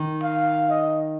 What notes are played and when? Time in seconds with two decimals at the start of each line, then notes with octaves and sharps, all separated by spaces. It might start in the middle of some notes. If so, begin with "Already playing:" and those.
Already playing: D#3
0.23 F5
0.70 D#5